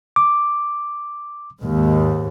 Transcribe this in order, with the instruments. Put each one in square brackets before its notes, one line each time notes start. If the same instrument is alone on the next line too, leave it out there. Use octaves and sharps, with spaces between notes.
[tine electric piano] D6
[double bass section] D#2 G#2